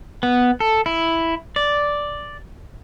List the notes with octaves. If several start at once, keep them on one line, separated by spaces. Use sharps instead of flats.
B3
A4
E4
D5